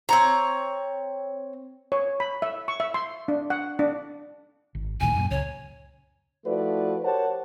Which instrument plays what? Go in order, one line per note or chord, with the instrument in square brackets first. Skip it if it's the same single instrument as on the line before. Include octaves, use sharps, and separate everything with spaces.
[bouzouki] C4 C#5 A#5
[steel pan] C#5
B5
E5
C#6
E5
C6
D4
F#5
D4
[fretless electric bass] G#1
[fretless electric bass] D1 A2 D#3 [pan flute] G#5
[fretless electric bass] F#2 A#2
[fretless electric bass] C#2 [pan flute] C#5
[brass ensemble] F3 A3 E4 F#4 B4 D5
G4 A#4 C5 C#5 F#5 A5